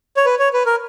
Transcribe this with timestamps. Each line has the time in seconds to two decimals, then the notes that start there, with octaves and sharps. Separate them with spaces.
0.17 C#5
0.25 B4
0.39 C#5
0.53 B4
0.66 A#4